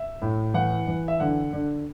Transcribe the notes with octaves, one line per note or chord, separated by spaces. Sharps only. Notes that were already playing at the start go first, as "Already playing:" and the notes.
Already playing: E5
A2
E3 F#5
E3
E5
D3 F#5
D3